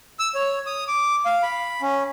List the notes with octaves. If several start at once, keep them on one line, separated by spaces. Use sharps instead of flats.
E6
C#5
D#6
D6
F5
B5
C#4